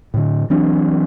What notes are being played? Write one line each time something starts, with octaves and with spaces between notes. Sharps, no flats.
A2 D3
E3 F#3 C4 D4